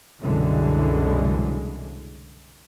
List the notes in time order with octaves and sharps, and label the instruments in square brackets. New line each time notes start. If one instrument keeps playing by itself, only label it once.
[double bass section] C2 F#2 B2 D3 E3 G#3